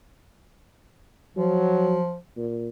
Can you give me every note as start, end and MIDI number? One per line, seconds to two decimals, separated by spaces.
1.37 2.17 53
1.37 1.99 54
2.37 2.69 46